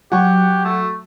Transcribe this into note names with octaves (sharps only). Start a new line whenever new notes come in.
F#3 F#4 G4 F#5 G#5 C#6
A3